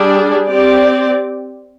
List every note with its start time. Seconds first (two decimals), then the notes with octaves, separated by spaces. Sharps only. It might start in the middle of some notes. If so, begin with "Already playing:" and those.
Already playing: G3 D4 G#4 D5
0.48 C4 G4 D5